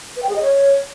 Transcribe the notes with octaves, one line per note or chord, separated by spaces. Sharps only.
B4
G5
G#4
D#5
C#5